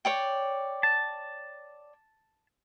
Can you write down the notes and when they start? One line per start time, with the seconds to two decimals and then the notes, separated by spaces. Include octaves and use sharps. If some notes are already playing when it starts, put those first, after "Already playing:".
0.05 C#5 D5 G5
0.83 A5